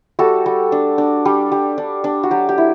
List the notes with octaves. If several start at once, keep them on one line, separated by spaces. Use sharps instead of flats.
G3 F#4 A4
G3
D4
D4
G3
G3
D4
D4
F#4
F#3 G4
G4
E4